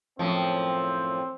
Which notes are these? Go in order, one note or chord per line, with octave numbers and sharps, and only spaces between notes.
F#2 A2 F3 C4